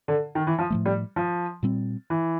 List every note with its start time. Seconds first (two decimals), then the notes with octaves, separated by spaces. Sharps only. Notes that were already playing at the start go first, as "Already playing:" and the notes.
0.08 D3
0.35 D#3
0.47 E3
0.59 F3
0.70 A2 F3 A3
0.86 G3
1.16 F3
1.63 A#2 G3 C4
2.10 E3